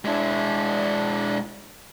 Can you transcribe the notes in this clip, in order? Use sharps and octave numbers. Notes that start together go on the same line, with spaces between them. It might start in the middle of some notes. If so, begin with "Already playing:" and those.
G#3 D4 E4